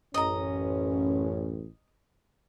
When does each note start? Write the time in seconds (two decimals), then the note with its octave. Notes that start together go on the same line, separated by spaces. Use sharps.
0.14 A1 F#2 C#4 D#5 A#5